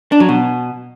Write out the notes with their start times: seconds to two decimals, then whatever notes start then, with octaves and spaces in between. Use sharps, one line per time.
0.12 D4
0.20 F#3
0.29 B2